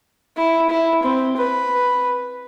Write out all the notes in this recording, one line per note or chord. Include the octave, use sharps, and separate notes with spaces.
E4
E4
C4
B4